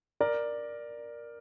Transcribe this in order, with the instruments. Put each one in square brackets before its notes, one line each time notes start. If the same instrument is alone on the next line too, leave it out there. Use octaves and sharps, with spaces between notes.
[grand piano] A#4 D5